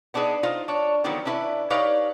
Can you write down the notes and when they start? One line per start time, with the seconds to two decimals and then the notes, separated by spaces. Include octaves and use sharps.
0.14 B3 D4 D#4 G#4 B4
0.43 D#4 F4 C5 F5
0.68 D4 C#5
1.04 D3 D#3 F3 F#3 B3
1.25 C#4 D4 E4 B4 C5 E5
1.70 D#4 G4 B4 C#5 D5 F5